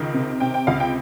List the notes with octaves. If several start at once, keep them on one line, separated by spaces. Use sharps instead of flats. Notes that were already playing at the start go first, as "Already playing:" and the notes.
Already playing: C#2 D#3
C3
C3 G5
G5
C#2 F5
G5